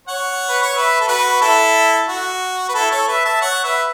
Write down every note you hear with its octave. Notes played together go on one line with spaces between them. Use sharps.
C#5 F#5
B4
C#5
B4 E5
A4
F#4 B4
E4 A4
F#4
B4
E4 A4
A4 C#5
B4 E5
E5 A5
C#5 F#5
B4 E5